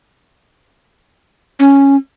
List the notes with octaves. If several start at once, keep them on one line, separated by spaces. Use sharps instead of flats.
C#4